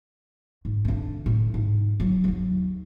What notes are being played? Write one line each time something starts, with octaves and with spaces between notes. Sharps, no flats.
G#2
D3 D4
A2
G#2
F#3
D#2 F#3